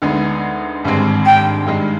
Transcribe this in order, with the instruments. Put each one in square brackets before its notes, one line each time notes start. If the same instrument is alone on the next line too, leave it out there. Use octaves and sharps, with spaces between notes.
[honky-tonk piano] D2 D3 G#3 B3 D#4
G#1 G2 D3 G#3 C4
[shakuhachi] G5
[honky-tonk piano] G2 D#3 G#3 D4